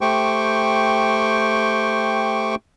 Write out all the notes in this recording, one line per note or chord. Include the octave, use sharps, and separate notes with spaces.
A3 G4 C5 G5 C#6